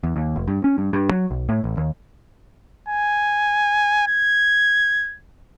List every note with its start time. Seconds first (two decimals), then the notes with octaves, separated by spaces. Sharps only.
0.03 E2
0.16 D#2
0.36 F1
0.48 G2
0.64 C#4
0.78 G2
0.93 G2
1.11 F#3
1.31 B1
1.49 A2
1.64 A1
1.77 D#2
2.89 G#5
4.08 G#6